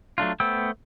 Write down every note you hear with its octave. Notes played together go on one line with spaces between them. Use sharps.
F#3 A3 D4 F4
A3 B3 C5 G5 E6